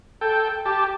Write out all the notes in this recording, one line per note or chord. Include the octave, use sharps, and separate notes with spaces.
A4 G5
G4 A5